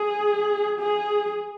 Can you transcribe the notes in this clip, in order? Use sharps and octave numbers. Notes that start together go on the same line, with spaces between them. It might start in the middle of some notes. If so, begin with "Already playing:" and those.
Already playing: G#4
G#4